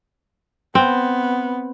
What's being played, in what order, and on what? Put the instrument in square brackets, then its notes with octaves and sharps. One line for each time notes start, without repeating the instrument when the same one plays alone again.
[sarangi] B3 [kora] C4